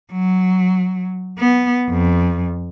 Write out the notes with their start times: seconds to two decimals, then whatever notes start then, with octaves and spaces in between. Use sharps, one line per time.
0.12 F#3
1.39 B3
1.90 F2